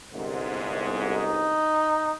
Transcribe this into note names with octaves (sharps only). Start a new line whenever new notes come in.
G1 C2 G#2
D#4